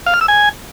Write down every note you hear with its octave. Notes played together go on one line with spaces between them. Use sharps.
F5
F6
E6
G#5